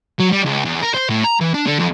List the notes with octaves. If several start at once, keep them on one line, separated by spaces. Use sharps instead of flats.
F#3
G3
C#2
E2
A#4
C5
A2
A#5
E3
D4
D3
F2